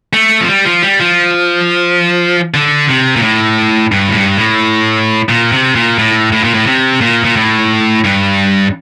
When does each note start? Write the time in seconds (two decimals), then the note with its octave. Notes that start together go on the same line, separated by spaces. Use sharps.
0.13 A3
0.41 F3
0.48 G3
0.65 F3
0.82 G3
1.00 F3
2.54 D3
2.89 C3
3.16 A#2
3.23 A2
3.92 G2
4.08 A2
4.15 G2
4.38 A2
5.29 A#2
5.52 C3
5.75 A#2
5.99 A2
6.32 A2
6.44 A#2
6.54 A2
6.67 C3
7.01 A#2
7.24 A#2
7.36 A2
8.04 G2